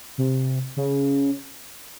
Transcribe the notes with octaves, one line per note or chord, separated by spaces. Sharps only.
C3
C#3